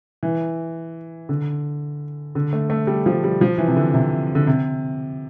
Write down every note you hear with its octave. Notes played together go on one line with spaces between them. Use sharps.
E3
D3
D3
A3
A3
G3
F3
G3
F3
E3
C3
D3
C3
D3
C3